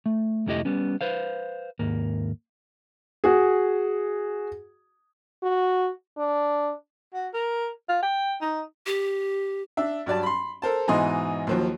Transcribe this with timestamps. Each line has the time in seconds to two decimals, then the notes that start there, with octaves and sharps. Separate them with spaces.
0.06 A3
0.46 C2 F2 A3 E4 G4 D#5
0.65 G3 B3 C#4
1.01 B4 C5 F5
1.79 D#2 G#2 A#3
3.24 F#4 G#4
5.43 F#4
6.18 D4
7.13 F#4
7.34 A#4
7.89 F4
8.02 G5
8.41 D#4
8.86 G4
9.77 D4 E5
10.06 G2 F#3 D5 A5
10.23 B5 C6
10.62 A4 A#4 C5 A5
10.88 G#2 B2 E3 D#5 C6
11.47 D#2 F3 F#3